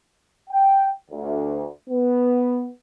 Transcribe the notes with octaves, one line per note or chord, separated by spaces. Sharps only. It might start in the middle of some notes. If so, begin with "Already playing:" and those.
G5
D2
B3